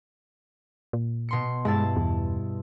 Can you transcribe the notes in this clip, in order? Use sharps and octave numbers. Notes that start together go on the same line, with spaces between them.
A#2
B2 C6 C#7
G2 G#3 E4 A5
E2